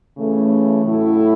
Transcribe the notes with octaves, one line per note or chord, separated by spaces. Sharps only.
C#3 E3 A3 C#4
A2 F#3 A3 E4 A4